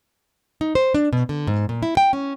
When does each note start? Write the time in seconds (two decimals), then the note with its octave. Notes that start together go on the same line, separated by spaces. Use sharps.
0.61 D#4
0.75 C5
0.94 D4
1.13 B2
1.29 D3
1.47 G#2
1.69 A#2
1.83 E4
1.97 G5
2.13 C#4